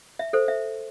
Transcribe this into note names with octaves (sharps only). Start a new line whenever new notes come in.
E5
A4 C5
E5